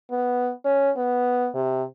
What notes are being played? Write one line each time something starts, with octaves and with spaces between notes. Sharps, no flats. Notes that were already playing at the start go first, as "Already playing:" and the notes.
B3
C#4
B3
C3